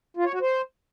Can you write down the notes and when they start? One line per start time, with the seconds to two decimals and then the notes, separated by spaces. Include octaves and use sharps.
0.17 F4
0.25 C#5
0.33 F#4
0.41 C5